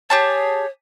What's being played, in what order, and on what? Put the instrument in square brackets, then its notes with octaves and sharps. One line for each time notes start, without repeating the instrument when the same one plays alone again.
[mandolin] G4 G#4 A5 [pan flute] C#5